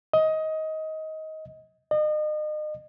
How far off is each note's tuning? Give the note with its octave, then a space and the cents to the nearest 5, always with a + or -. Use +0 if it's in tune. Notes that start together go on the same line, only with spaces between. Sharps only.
D#5 +20
D#5 -35